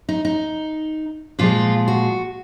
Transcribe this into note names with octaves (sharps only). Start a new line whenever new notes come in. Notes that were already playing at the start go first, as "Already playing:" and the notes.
D#4
D#4
A#2 F3 G#3 F4
F#4